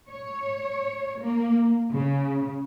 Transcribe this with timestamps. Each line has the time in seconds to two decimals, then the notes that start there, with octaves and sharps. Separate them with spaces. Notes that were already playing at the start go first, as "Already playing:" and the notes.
0.10 C#5
1.21 A#3
1.92 C#3